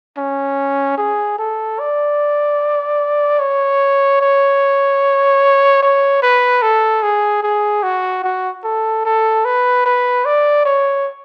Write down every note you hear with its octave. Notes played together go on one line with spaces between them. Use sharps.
C#4
G#4
A4
D5
C#5
C#5
C#5
B4
A4
G#4
G#4
F#4
F#4
A4
A4
B4
B4
D5
C#5